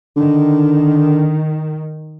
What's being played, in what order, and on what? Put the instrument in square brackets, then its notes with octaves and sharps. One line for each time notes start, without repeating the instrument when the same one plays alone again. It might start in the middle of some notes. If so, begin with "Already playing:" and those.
[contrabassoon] D3 [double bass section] D#3